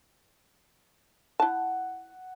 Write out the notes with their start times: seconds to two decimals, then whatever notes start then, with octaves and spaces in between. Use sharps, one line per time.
1.40 E4 F#5 A5